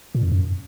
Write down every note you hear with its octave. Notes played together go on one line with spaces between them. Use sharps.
A#2
F2
F#2